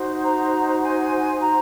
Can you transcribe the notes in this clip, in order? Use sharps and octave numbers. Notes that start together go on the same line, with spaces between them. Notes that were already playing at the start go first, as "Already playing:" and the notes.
Already playing: D#4 F#4 C5
A#5
G#5
A#5